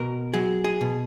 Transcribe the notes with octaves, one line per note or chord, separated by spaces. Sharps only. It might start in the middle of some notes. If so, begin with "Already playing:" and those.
Already playing: B2 A#4
F#3 G#4
G#4
B2